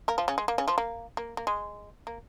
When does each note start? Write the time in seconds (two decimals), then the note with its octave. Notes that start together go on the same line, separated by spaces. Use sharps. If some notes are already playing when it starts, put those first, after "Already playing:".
0.08 A#3 A#4
0.18 F3 F4
0.28 C#3 C#4
0.38 G#3
0.48 A#3
0.58 C#3 C#4
0.68 F3 F4
0.78 A#3
1.17 A#3
1.37 A#3
1.47 G#3
2.07 A#3